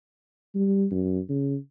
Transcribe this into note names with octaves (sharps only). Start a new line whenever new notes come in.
G3
F#2
C#3